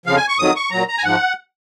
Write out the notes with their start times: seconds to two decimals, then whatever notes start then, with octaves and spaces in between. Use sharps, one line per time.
0.06 F2 C#3 F3 F5
0.17 G#5
0.28 C#6
0.38 F2 D#3 F#3 D#6
0.56 C#6
0.71 A#2 F#3 A#5
0.88 A#5
0.98 G#5
1.04 G#2 F3 F#5